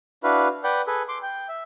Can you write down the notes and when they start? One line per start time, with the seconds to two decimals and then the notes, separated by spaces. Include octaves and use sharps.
0.23 D4 E4 F#4 B4 F5
0.64 B4 D5 F#5 G5
0.87 G#4 A4 B4
1.09 C6 D6
1.22 G5
1.49 E5